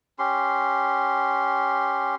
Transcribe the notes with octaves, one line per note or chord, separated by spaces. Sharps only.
C#4 G4 C6